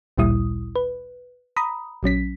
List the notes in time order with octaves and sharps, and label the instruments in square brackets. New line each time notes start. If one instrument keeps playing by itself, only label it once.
[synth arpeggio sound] A1 D2 A#2 G3 E4 D#6
B4
A#5 B5 D#6
A#1 F#3 C#4 B6